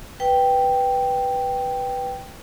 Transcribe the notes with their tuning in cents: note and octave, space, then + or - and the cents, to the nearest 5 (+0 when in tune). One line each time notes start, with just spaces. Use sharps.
B4 +0 G5 +0